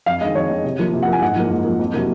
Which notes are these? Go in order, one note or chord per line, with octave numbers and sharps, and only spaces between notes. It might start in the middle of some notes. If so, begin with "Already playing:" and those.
F2 F5
D#3 G#3 D#5
F2 C#5
D#3 G#3
C3
F3 A#3
C3
F#5
F3 A#3 G#5
G#2 F#5
F3 A#3
G#2
F3 A#3
F2
C3 F#3 A#3